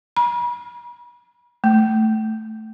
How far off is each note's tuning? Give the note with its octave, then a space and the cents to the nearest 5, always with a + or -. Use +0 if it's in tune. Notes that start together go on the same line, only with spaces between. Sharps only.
B5 -40
A3 +0